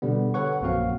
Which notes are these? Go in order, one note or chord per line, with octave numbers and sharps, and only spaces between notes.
B2 D3 G3 B3
A4 B4 C#5 F#5 C#6
A#1 F#2 A#3 C4 F#4 F5